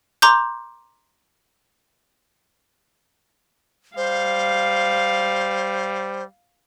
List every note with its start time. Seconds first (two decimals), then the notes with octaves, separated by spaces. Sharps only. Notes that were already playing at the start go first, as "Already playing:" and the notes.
0.22 A#5 C6 D6 G6
3.97 G3 C5 F5